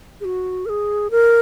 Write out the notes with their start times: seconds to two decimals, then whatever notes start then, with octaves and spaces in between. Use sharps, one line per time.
0.21 G#4
0.25 F#4
0.66 A#4
0.69 G#4
1.11 A#4